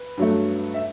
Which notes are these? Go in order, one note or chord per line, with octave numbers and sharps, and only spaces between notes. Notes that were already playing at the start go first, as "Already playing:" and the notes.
Already playing: B4
G2 F#3 A3
E5